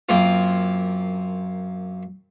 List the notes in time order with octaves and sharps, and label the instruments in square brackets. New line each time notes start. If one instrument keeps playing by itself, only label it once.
[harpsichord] F#2 A#3 C4 F4